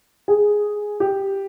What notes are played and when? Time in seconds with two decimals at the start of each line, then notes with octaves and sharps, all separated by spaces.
0.28 G#4
1.00 G4